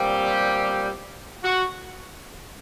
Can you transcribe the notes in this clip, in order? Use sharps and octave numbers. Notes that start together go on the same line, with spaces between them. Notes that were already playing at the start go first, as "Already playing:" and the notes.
Already playing: A#2 G3 C4 G4
F#4